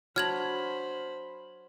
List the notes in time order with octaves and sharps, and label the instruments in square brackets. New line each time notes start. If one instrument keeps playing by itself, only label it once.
[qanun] F#3 A#5 [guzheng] D4 [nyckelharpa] C5 B5 [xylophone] F6 G#6 F#7